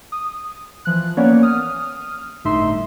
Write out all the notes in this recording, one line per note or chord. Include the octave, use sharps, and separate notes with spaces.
D#6
E3 F3 F#6
A#3 B3 C#4 C#5 D5
D#6 F6
G1 A2 D#4 E5 C6